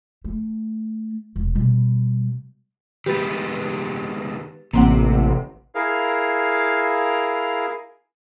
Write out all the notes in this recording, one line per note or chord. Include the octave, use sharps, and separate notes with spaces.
A3
E1
B2 G3
D#3 G#3 B3 G4 B4 A6
A1 C3 A#3 C4 F#5
E4 G#4 A#4 F5